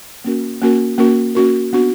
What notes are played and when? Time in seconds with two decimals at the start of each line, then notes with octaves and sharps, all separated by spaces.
0.24 A#3 C#4 F#4 A#4
0.61 A#3 C#4 F#4 A#4
0.98 A#3 C#4 F#4 A#4
1.35 A#3 C#4 F#4 A#4
1.73 B3 D4 F#4